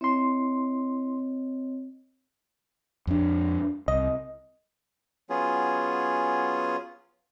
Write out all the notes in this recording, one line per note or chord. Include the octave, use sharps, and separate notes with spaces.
C4 E4 C#5 D#5 C6
F2 D4
C2 D#5
F#3 B3 C#4 F4 G#4